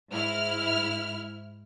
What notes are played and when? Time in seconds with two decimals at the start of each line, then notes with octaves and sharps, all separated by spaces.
0.12 G#2 E4 F6